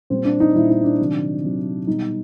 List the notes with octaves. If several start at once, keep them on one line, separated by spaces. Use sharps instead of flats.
A#2 G3 C4
D4
D#4
A#2 G3 E4
D#4
D4
C3 D#3 F#3
C3 D#3 F#3
B2 G3 D#4